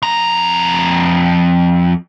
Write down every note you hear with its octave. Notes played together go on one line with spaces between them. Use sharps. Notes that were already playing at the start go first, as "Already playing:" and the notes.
F2 A#5